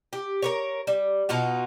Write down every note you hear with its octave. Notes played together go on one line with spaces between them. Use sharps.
G4
A#4 B4 C#5
G3
B2 D#4 F4 F#4